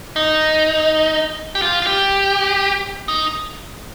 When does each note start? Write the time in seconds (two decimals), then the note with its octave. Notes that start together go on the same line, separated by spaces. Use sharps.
0.16 D#4
1.55 G4
1.62 F4
1.82 F4
1.87 G4
3.08 D#4